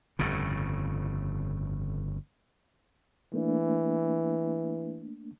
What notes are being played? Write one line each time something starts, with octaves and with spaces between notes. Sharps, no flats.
G1 F2 A2 C#3
E3 A3 A#3 D4